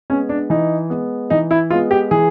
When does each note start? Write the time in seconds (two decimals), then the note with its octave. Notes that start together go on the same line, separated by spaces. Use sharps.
0.10 G#3 B3 C#4
0.29 D4
0.50 E3 D#4
0.90 G#3 B3
1.30 E3 D#4
1.51 E4
1.70 G#3 B3 F4
1.91 G4
2.11 E3 G#4